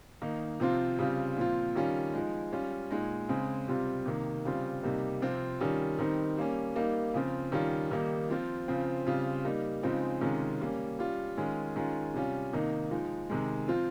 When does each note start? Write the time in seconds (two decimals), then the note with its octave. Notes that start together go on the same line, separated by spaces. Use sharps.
0.22 D#3 A#3 D#4
0.60 C3 F3 C4 F4
0.99 C#3 G3 C4 F4
1.37 A#2 F3 C4 F4
1.75 D#3 G3 C#4 F4
2.13 F3 G#3 D#4
2.53 G3 C#4 F4
2.91 A#2 G#3 D#4
3.29 C#3 G#3 C4
3.68 C3 G3 C4 F4
4.06 C3 D#3 A#3
4.45 C#3 G3 C4 F4
4.83 C3 G3 A#3 D#4
5.22 C3 F3 C4 F4
5.60 D#3 G3 C#4 F4
5.99 D#3 G3 C4 D#4
6.37 G3 A#3 C#4
6.75 G3 A#3 D#4
7.14 C#3 F3 C4 F4
7.52 D#3 G3 C#4 F4
7.91 D#3 G3 A#3 D#4
8.30 F3 C4 F4
8.68 C#3 F3 C4 F4
9.07 C#3 G3 C4 F4
9.45 G3 A#3 D#4
9.83 C#3 F3 G#3 C4 D#4
10.21 C3 D#3 G#3 C#4 F4
10.61 G3 A#3 C#4
10.99 G3 C#4 F4
11.37 D#3 G#3 C#4 F4
11.76 D#3 G#3 C#4 F4
12.14 C3 G3 C#4 F4
12.53 C3 D#3 A#3 D#4
12.91 F3 G#3 D#4
13.30 C3 D#3 G#3
13.68 F3 C4 F4